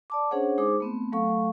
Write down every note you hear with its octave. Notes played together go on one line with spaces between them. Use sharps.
D5 A5 D6
C#4 D4 G#4 C5 C#5 F#5
G#3 D#4 G#4 C5 D6
A3 B3 C4
F#3 A3 A4 F5 C#6